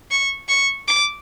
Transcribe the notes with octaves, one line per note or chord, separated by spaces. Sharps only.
C#6
C#6
D6